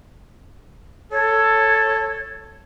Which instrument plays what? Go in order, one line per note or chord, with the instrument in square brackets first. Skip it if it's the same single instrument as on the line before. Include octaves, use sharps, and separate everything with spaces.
[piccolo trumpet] A4 [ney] C#5